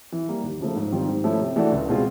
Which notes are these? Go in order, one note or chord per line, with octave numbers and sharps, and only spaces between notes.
E3
G3 A#3
D#2
C#3 F3 A3
G#2
D#3 G3 C4 F4
G#2
F3 A3 C#4 E4
C3
E3 A3 D4 F#4
C#2
B2 G#3 C4 F4